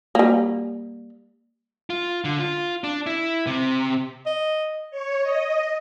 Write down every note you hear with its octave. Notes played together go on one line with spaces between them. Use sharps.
G3 A#3
F4
D3
F4
D4
E4
C3
D#5
C#5
D#5